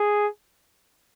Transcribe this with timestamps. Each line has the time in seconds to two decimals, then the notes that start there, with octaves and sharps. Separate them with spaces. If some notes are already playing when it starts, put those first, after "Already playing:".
Already playing: G#4